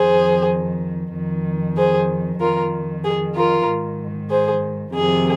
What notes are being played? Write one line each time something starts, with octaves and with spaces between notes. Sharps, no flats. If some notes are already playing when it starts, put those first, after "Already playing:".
Already playing: F2 D#3 G#4 C5
F2 D#3
G#4 C5
F2 D#3 F4 A#4
G#4
F4 A#4
G#2 D#3
G#4 C5
F2 C3 D#3 G#4